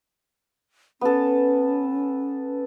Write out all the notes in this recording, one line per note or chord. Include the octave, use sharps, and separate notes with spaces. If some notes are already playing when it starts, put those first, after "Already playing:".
B3 C#4 A4